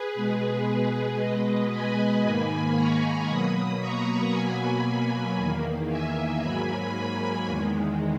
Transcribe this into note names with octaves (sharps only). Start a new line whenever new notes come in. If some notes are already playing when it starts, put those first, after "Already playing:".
Already playing: G#4 B4
B2 G#3
B2 G#3 B4 D#5
G#5 B5
G#2 D#3 A#3
A#5 C#6
B2 F#3 A#3 B5 D#6
A#5 C#6
B2 F#3 A#3 G#5 B5
E2 D#3 A#3
E5 G#5
G#2 F#3 A#3 G#5 B5
G#5 B5
E2 D#3 G#3